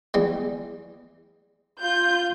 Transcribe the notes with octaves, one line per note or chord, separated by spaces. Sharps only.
E2 G3 G#3
F4 G6